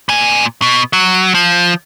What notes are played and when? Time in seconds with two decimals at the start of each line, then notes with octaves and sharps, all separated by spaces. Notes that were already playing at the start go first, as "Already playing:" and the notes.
0.09 A#2 G#5
0.62 B2
0.93 F#3
1.34 F3